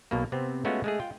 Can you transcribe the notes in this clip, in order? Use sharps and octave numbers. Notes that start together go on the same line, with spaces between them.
B1 B2 A#3
C3 B3 C4
G#3 A3 B3 C#4 F4 F#4
G#3 A3 G#4
F4 G5